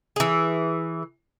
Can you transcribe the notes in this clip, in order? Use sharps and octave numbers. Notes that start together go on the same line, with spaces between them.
E3 G#4